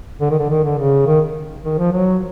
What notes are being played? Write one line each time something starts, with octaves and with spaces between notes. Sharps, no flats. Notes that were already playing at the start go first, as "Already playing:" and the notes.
D3
D#3
D3
D#3
D3
C#3
D#3
D#3
F3
F#3